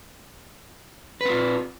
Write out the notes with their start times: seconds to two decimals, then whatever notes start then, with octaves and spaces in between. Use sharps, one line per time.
1.21 B4
1.25 C4
1.30 F4